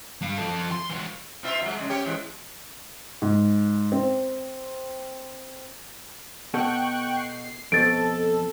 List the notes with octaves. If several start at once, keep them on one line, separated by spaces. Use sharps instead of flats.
G2 F5
F3 A4
C6
E3 F#4
B2 F4 E5
F#3 G#3
C#3 G3 G#3
C#4 G4 C#5
E3 G#3
G#2
C4
B2 A4 F#5 G5 C#6 F#6
C7
F2 B2 A4 A6 D7